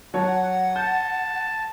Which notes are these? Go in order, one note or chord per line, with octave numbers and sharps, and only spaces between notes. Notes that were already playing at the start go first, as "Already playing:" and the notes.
F#3 C#5 F#5 A5
A5 G6